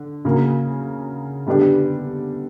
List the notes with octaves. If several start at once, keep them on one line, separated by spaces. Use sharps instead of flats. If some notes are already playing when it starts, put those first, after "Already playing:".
Already playing: D3
C#3 F#3 A#3
D3 G3 B3 D4 G4